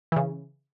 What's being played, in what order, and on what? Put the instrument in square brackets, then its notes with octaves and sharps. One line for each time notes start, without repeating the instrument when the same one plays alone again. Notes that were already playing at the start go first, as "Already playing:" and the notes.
[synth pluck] C#3 E3